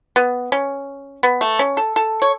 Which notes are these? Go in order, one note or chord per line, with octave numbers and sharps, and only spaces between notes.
B3
C#4
B3
A3
C#4
A4
A4
C#5